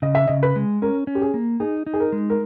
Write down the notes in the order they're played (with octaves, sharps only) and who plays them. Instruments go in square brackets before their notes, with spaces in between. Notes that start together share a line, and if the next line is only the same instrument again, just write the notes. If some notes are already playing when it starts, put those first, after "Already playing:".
[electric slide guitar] C#3 [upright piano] D#5
[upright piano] E5
[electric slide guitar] C#3 [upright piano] D#5
[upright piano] B4
[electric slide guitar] G#3
[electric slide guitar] C#4 [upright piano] A#4
[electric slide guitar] C#4
[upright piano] G4
G#4
[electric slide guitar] A#3
[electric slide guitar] D#4 [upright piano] G#4
[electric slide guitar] D#4
[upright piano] G#4
A#4
[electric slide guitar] G#3
[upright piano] A#4